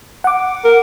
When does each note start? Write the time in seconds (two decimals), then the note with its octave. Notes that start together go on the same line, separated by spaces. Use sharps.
0.24 F#5 D6
0.65 A#4